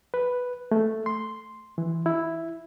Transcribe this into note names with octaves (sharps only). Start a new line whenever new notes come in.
B4
A3
C6
E3
E4